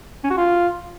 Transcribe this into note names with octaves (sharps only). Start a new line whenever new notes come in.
C#4
F#4
F4